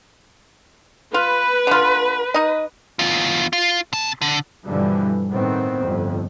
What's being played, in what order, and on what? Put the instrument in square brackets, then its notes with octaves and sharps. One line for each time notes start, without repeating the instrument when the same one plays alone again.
[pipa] F4 [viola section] B4
[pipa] D3 F4
D#4 D#5
[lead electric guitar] E2 F4
F4
C3 A5
D3
[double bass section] G2 B2 D3 E3 F3 G3
A2 D#3 B3 C4
G1 F2 A2